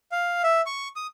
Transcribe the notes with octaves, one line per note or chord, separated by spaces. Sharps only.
F5
E5
C#6
D#6